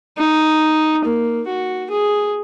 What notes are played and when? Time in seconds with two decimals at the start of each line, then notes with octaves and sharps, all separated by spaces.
0.17 D#4
1.05 A#3
1.47 F#4
1.90 G#4